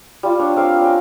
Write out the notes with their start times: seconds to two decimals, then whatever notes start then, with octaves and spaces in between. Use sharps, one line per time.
0.23 G3 F4
0.39 D4 C#5
0.56 C4 A#4 F5
0.69 A#4
0.81 C#4 A#4 G5